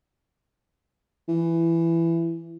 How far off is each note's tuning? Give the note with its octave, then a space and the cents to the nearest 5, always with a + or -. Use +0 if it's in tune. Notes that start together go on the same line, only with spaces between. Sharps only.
E3 +15